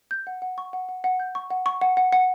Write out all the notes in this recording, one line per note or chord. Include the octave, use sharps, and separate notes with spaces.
G6
F#5
F#5
C#6
F#5
F#5
F#5
G6
C#6
F#5
C#6
F#5
F#5
F#5